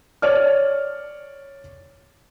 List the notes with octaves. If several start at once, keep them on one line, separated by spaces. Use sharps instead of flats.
C#5 D5 F6